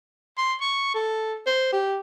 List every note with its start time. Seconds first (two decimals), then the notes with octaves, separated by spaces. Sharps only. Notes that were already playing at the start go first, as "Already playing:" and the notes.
0.38 C6
0.61 C#6
0.95 A4
1.47 C5
1.73 G4